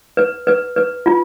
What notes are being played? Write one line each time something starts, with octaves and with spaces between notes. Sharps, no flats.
B4
B4
B4
F4